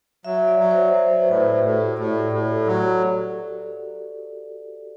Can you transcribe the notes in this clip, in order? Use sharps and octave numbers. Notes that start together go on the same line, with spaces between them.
F#3 E5
D5
F#3
C5
F#3 C5
B4
A2 B4
A4
F#4
A2 G4
F#4
A2 D5
A4
A2
F#3